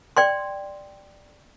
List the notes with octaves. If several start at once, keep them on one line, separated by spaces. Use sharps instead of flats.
D5 G5 C6